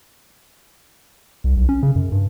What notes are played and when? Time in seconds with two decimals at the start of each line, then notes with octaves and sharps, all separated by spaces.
1.44 C2
1.57 B1
1.69 C#4
1.83 C#3
1.96 F#2
2.12 G2